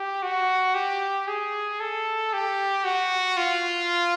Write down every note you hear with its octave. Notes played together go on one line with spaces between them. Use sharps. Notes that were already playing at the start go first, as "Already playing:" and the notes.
Already playing: G4
F#4
G4
G#4
A4
G4
F#4
F4